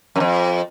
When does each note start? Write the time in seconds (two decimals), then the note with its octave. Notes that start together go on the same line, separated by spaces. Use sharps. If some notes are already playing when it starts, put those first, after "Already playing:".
0.16 F#2
0.20 F2